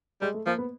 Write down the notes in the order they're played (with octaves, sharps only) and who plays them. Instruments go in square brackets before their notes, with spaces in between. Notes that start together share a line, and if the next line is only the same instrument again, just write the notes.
[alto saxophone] G3 [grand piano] G#3
[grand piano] A3
[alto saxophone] F3 [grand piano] A#3
[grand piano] B3